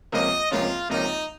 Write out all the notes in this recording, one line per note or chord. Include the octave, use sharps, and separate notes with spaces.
C#2 C3 F3 A#3 C#4 D#5
C#2 C3 F3 A#3 C#4 F4
C#2 C3 F3 A#3 C#4 D#4